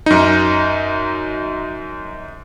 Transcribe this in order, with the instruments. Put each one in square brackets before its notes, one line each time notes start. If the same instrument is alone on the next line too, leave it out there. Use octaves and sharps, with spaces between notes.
[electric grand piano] F#2 D#4